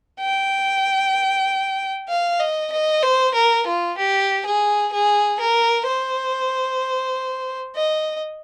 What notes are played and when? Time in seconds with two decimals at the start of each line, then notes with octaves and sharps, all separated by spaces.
0.20 G5
2.08 F5
2.40 D#5
2.72 D#5
3.03 C5
3.34 A#4
3.67 F4
3.98 G4
4.45 G#4
4.93 G#4
5.40 A#4
5.87 C5
7.76 D#5